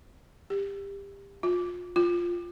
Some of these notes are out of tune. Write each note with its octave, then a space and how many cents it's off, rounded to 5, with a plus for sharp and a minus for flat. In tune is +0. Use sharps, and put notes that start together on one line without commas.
G4 +25
F4 +25
F4 +0